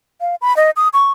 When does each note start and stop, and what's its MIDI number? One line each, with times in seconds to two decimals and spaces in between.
0.21 0.35 77
0.41 0.55 83
0.57 0.70 75
0.76 0.88 87
0.93 1.12 85